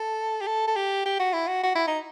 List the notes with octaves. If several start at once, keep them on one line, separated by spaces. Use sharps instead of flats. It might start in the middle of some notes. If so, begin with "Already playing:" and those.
Already playing: A4
G4
A4
A4
G4
G4
F#4
E4
F#4
F#4
E4
D#4